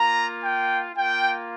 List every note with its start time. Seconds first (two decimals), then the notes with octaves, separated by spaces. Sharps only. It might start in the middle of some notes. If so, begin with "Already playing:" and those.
Already playing: A#3 F4 A#5
0.42 G5
0.95 A#3 F4 G5